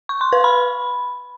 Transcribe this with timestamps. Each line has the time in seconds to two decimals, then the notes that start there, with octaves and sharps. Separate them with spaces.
0.09 C#6
0.21 C6
0.32 B4
0.44 B5